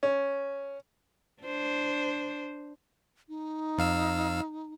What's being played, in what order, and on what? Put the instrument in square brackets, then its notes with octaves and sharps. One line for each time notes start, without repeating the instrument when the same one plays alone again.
[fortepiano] C#4
[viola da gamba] D4 C5
[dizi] D#4
[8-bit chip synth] F2 F5 E6